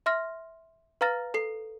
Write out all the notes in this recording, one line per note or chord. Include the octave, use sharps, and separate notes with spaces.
E5 C6 F6 A#6
B4 F5 A#5 F6 A6 A#6
A4 C7